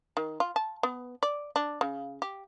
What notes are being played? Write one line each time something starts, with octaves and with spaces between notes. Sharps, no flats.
D#3
F4
A5
B3
D5
D4
C#3
G4